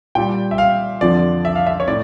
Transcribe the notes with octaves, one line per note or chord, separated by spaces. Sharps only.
A#2 G3 G5
E5
F5
F2 D3 F3 D5
E5
F5
E5
C#5
A2 D5